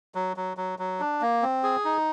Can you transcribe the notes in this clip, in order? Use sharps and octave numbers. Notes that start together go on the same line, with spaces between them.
F#3
F#3
F#3
F#3
D4
A#3
C4
G#4
D#4